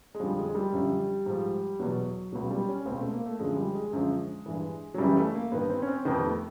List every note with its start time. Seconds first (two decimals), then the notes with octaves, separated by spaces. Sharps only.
0.15 G#3
0.20 F2 D3 F3 G3
0.38 G#3
0.49 G#3
0.55 G3
0.72 F#2 D3 F3
1.26 G#2 F3
1.79 E2 B2 F#3
2.33 C#2 B2 F#3
2.51 G3
2.68 C#4
2.85 C#2 B2 C4
2.99 A3
3.12 A#3
3.26 A3
3.39 F#2 D3 F3 G#3
3.56 G3
3.75 G#3
3.93 F#2 D3 F3
4.46 G2 E3
4.94 F#3
4.98 F#2 C#3 E3 G3
5.17 A3
5.34 A#3
5.52 G2 D#3 B3
5.70 C4
5.82 C#4
5.88 C4
6.05 F2 C3 D#3 B3
6.23 A3